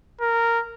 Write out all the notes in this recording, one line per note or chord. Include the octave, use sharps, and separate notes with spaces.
A#4